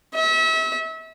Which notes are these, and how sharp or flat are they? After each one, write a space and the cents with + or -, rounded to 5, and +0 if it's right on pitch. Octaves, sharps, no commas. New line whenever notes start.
E5 -35